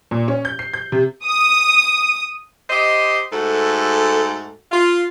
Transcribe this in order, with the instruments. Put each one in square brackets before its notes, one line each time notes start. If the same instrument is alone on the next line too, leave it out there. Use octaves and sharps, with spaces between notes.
[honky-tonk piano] A#2
C#4
G6
C7
G6
C3
[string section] D#6
[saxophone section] G4 C5 D#5
G#2 A3 F#4 A4
F4